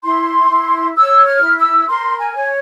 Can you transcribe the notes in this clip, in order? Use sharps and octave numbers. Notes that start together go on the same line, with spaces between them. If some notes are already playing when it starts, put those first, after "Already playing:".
E4 C6
E4
C#5 E6
F6
E4
E6
A#4 C6
G#5
C#5